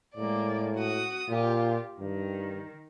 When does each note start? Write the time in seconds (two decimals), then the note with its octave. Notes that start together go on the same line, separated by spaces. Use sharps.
0.17 A2 G#3 A#3 D5
0.75 F#4 D#6
1.30 A#2 F4 G4
2.00 G2 D#3